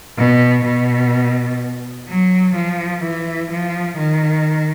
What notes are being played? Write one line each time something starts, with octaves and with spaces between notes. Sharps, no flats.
B2
B2
F#3
F3
E3
F3
D#3